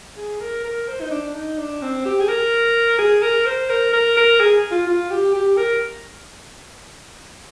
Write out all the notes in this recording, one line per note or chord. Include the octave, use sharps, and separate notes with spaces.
G#4
A#4
A#4
C5
D#4
D4
D#4
D4
C4
G4
G#4
A#4
G#4
A#4
C5
A#4
A#4
A#4
G#4
F4
F4
G4
G4
A#4